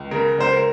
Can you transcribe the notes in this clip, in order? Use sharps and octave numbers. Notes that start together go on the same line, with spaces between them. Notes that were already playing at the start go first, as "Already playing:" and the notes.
Already playing: C#2
C#3 A#4
C#2 C5
A#4